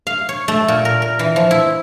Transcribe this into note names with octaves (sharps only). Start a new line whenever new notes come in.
F5
C#5
A3
A#2
A#4
A#4
E3
F3
E4